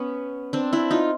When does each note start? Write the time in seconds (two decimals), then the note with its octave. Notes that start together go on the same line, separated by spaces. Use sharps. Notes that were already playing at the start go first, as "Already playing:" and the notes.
Already playing: B3 C#4
0.53 C4 D4
0.73 D4 E4
0.91 D#4 F4